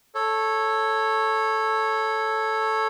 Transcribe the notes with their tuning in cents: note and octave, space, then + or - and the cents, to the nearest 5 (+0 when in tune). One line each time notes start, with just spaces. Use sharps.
A4 +0 C#5 -10